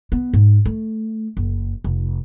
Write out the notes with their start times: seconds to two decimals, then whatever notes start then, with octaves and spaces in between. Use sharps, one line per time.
0.12 B3
0.33 G#2
0.65 A3
1.37 F#1
1.84 F1